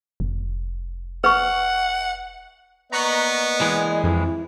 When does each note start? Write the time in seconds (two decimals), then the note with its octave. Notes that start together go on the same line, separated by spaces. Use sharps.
0.20 F1
1.24 B4 F#5 C#6
2.92 A#3 B3 D5 D#5 A#5 C#6 F#6
3.61 E3 G#3
4.04 F2 E4